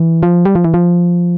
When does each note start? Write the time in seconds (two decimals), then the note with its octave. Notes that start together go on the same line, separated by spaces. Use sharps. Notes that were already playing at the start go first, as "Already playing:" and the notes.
Already playing: E3
0.23 F3
0.46 G3
0.55 F3
0.65 E3
0.74 F3